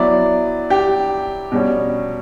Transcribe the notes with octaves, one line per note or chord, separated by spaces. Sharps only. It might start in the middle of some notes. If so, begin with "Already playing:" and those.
Already playing: F#3 B3 E4 D5
G4
B2 G3 C#4